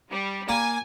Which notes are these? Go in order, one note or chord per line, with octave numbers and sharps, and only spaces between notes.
G3
A#3 G#5